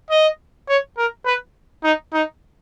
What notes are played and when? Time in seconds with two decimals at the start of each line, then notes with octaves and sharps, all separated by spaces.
0.10 D#5
0.69 C#5
0.97 A#4
1.25 B4
1.84 D#4
2.14 D#4